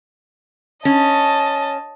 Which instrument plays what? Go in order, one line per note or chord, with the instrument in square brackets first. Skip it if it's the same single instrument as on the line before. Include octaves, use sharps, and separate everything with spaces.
[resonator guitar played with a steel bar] C#4 [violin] D#5 A5